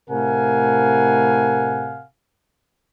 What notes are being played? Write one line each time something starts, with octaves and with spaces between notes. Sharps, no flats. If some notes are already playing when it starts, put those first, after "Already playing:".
A2 C3 A#4 F5 F#5 G#5